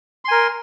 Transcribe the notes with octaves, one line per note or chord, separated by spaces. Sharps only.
A#4 G#5 C6